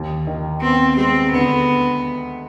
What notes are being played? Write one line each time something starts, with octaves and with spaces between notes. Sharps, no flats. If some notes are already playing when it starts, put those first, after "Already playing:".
Already playing: D#2
D#3
B3 C4
G#3 C4
D2 B3